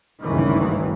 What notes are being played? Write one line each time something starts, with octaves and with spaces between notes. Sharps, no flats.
F#1 D2 G2 D#3 E3